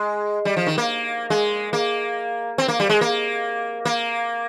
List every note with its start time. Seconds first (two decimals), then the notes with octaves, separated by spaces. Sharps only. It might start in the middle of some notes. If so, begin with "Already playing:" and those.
Already playing: G#3
0.45 G3
0.57 F3
0.67 D#3
0.78 A#3
1.30 G#3
1.73 A#3
2.58 C4
2.68 A#3
2.80 G3
2.89 G#3
3.01 A#3
3.85 A#3